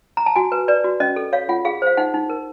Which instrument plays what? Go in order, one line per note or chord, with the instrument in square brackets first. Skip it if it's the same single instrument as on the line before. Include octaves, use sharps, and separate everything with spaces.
[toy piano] A#5
A5
F#4 G#5
B4
B4 D5
F#4
C#4 D#5
A4
C#5 F5
F4 F#5
G#4 F5
C5 F5
D#4 F#5
D#4
A#4